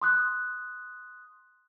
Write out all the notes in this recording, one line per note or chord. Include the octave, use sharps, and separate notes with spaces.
C6 D#6 F#6